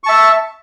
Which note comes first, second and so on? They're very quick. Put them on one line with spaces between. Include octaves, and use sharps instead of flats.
C#6 A5 E5